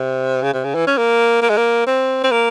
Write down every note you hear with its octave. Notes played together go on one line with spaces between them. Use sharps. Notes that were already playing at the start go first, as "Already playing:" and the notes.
Already playing: C3
C#3
C3
C#3
E3
C#4
A#3
A#3
G#3
A#3
C4
C4
A#3